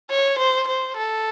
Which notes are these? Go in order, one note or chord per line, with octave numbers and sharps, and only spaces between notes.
C#5
C5
C5
A4